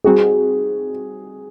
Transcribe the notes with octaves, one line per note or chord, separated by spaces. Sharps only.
G3 C4 D#4 F#4 G#4